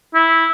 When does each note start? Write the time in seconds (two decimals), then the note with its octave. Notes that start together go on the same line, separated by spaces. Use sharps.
0.15 E4